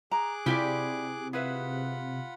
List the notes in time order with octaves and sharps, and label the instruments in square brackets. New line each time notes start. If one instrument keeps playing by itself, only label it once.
[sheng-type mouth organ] G#4 D6 F#6 [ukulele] A#5
[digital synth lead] C3 [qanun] E4 G5 G#5 [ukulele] F4 G4 D5
[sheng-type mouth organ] F4 F#5 B5 [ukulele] G#4 B4 E5